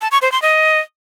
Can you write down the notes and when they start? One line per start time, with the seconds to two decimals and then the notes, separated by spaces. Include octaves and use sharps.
0.02 A5
0.12 C#6
0.22 C5
0.32 C6
0.42 D#5